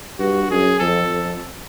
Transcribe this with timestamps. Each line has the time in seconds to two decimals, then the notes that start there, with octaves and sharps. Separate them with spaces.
0.19 G2 F#4
0.50 F#2 G#4
0.80 F2 A4
1.11 F2